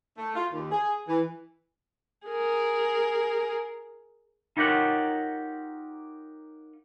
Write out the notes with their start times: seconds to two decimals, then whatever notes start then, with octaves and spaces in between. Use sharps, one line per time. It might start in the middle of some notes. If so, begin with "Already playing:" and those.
0.17 A3
0.35 F4
0.52 D#2
0.71 G#4
1.07 E3
2.27 G#4 A#4
4.57 D#4 F4 G4 A#4 C#5 F#5